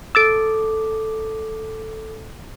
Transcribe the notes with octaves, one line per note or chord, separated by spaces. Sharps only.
A4 D6 E6 A6 D7